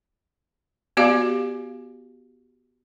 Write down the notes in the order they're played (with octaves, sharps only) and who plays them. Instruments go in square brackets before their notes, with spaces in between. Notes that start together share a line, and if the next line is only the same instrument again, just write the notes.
[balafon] B3 F#4 G4 D5 F5